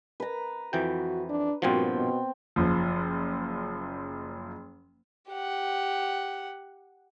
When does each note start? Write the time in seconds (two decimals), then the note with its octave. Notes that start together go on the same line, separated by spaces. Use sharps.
0.20 B4 A#5
0.73 F2 E3 F#4 G5
1.29 D4
1.62 G2 A#2 F3 B3 C4 F#4
1.95 B2
2.56 F#1 F3
5.30 G4 F#5